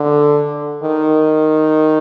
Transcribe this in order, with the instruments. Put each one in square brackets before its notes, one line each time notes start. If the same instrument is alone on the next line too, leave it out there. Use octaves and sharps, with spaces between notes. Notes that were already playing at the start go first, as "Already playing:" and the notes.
Already playing: [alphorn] D3
D#3